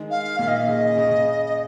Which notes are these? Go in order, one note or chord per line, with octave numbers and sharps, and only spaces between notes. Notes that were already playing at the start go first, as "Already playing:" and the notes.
Already playing: D#3 G#3
F5
A#2 D#3 F5
D#5
F5
C#3 D#5
C#3
C#3
D#5